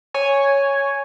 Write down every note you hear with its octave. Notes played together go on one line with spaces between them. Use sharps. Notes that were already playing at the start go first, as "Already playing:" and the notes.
C#5 G#5